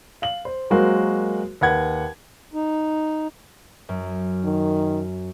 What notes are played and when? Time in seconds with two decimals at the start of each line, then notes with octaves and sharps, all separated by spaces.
0.22 F5 F#7
0.45 C5
0.70 F#3 G#3 A#3 F#4 A#4 C5
1.61 D#2 B4 F#5 G#6
2.54 D#4
3.89 F#2
4.45 D#3